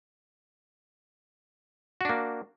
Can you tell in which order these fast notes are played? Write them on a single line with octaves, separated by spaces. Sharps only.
F#4 D4 A#3